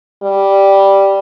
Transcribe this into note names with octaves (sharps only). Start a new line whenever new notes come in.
G3